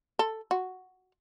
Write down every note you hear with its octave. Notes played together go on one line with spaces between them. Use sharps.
A4
F#4